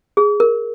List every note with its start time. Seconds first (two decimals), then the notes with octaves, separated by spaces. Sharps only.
0.17 G#4
0.40 A#4